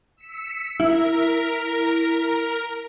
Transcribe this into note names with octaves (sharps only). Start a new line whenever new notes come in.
E6 B6 C#7
E4 A#4